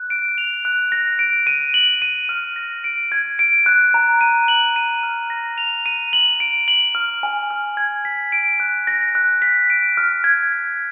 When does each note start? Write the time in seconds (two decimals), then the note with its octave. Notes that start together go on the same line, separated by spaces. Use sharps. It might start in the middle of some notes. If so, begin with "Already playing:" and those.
Already playing: F#6
0.10 D7
0.38 F7
0.65 F#6
0.92 A#6
1.19 D7
1.47 D#7
1.74 F#7
2.02 D#7
2.29 F6
2.56 A#6
2.84 D7
3.12 G#6
3.39 D7
3.66 F#6
3.94 A#5
4.21 D#7
4.48 F#7
4.76 D#7
5.03 F6
5.30 A#6
5.58 F7
5.86 D#7
6.13 F#7
6.40 D7
6.68 F#7
6.95 F6
7.23 G#5
7.51 F6
7.77 G#6
8.05 B6
8.32 D7
8.60 F#6
8.87 A#6
9.15 F#6
9.42 B6
9.70 D7
9.97 F6
10.24 G#6
10.52 B6